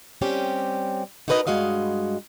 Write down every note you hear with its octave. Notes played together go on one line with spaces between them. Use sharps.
G3 C4 C#4 G4
D#4 F#4 A#4 B4 C#5 D#5
G2 G#3 F#4 D#5 F5